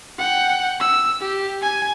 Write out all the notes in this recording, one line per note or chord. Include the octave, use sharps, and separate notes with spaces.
F#5 G5
E6
G4
G#5